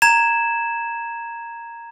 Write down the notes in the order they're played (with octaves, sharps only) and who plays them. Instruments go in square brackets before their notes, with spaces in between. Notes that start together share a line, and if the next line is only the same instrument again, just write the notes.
[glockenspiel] A#5 G#6 E7